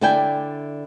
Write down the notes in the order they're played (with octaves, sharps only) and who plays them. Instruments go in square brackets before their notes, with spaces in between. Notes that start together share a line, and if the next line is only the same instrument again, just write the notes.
[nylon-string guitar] D3 E4 D5 E5 G5 G#5